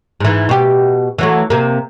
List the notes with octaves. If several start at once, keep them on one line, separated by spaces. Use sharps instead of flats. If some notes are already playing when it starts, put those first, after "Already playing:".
G#2 E3
B2 G4
E3 F#3 A3
C3 A#3